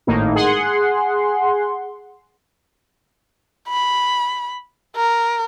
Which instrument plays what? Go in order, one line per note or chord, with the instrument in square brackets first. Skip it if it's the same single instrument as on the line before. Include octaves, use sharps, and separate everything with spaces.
[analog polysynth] G#1 A2 A#3 D#4
G#4 F#5 C6
[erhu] B5
A#4